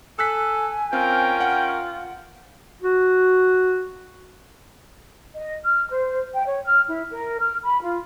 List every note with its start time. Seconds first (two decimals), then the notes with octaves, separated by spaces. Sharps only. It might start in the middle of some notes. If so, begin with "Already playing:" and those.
0.19 A4 G#5 E6 F#6 B6
0.93 C4 C#4 F4 A#4 G5
1.40 F#5
2.82 F#4
5.34 D#5
5.64 F6
5.90 C5
6.34 G5
6.46 C#5
6.65 F6
6.88 E4
7.11 A#4
7.41 F6
7.63 B5
7.81 F4